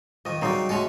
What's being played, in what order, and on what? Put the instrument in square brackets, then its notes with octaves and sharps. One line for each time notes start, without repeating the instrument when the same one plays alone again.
[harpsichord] F2 D#3 [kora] D#5
[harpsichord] C#3 F#3 G3 [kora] C4 D#4 C5
[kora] G#3 C#4 [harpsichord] A3 F#4 A4